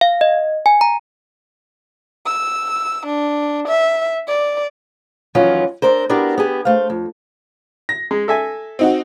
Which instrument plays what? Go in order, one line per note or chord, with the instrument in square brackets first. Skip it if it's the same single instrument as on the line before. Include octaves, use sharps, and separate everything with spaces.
[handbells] F5
D#5
G#5
A#5
[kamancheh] E6
D4
E5
D5
[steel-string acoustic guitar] F2 D#3 E3 F#3 C#4 F4
C4 D4 A#4 C5
B3 D4 E4 F#4 G4 A#4
B3 G4 G#4
A3 C5 F5
F2
[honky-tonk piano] A#6
[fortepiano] G#3
A4 E5 G#5
[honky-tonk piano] C4 D#4 F#4